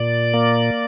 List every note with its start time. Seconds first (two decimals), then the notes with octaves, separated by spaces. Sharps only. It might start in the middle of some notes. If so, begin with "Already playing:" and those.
Already playing: A#2 D5
0.34 A#3